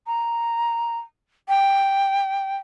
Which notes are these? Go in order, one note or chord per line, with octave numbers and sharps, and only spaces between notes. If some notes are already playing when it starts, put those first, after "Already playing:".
A#5
G5